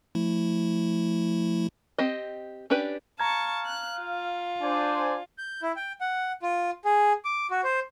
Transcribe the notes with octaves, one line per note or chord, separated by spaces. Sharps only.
F3 A3 E4
C4 G4 D#5
C#4 D4 G4 B4
F5 A5 A#5 C#6 G#6
F#6
F4
D4 C5 D5 G#5
G6
E4
G5
F#5
F4
G#4
D6
F#4
C5